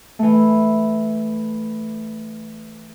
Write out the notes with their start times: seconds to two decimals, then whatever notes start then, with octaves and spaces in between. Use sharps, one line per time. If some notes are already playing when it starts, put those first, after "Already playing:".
0.19 E3 A3